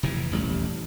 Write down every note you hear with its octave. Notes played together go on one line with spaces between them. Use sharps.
F1 A2 E3
D#1 A1 G3